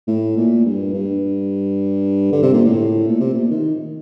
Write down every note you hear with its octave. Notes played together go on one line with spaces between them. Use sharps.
A2
A#2
G2
G2
D3
C3
A#2
A2
A#2
C3
A#2
D#3